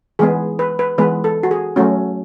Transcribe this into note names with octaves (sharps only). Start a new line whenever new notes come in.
E3 G#3 B3 G#4
B4
B4
E3 G#3 B3 B4
A4
F#4
G#4
F#3 A3 C#4 F#4